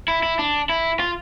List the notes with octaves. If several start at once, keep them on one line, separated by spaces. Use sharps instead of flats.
E4
E4
D4
E4
F4